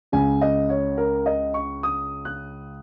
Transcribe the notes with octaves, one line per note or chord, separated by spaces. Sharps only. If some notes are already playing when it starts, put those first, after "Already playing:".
C#2 C#3 G#5
D#5
C#5
A#4
D#5
C#6
D#6
F#6